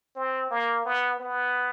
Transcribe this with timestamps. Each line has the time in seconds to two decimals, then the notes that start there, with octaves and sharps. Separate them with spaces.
0.16 C4
0.51 A#3
0.85 B3
1.20 B3